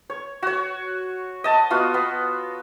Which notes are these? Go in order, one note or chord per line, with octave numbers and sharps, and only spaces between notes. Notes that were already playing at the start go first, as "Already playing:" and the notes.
C#5
F#4 C#5
D#5 A5
B3 F4 F#4
B3